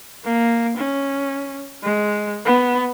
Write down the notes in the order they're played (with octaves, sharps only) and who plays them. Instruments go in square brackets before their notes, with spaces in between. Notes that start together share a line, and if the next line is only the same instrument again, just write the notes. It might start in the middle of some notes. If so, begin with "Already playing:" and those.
[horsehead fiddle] A#3
C#4
G#3
B3